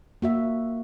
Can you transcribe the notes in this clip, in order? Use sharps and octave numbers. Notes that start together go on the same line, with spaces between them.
A#3 F#4 E5